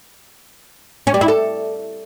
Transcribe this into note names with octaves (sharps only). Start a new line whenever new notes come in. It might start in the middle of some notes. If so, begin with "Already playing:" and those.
C#4
G3
E4
A4